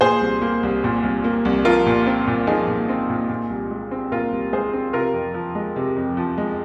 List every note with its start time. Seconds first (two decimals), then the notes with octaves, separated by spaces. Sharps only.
0.01 A#2 G#4 C5
0.21 C2
0.42 A#3
0.63 C2
0.84 A#2
1.04 C2
1.24 A#3
1.45 C2
1.65 F3 F4 A#4
1.86 A#2
2.07 C4
2.27 A#2
2.47 F3 D#4 G#4
2.68 A#2
2.89 C4
3.10 A#2
3.29 A#2
3.50 C2
3.70 G#3
3.91 C4
4.12 A#2 F4 A#4
4.32 C2
4.53 G#3 G#4 C5
4.73 C4
4.93 C3 F4 A#4
5.14 F2
5.34 F3
5.55 G#3
5.76 C3
5.96 F2
6.17 F3
6.38 G#3